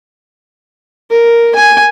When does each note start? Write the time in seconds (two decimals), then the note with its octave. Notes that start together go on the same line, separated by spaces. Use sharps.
1.10 A#4
1.56 G#5